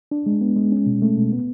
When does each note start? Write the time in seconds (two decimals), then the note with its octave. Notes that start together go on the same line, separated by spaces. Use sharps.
0.11 D4
0.26 G#3
0.41 B3
0.56 G#3
0.72 C#4
0.86 B2
1.02 A3
1.17 B2
1.32 B3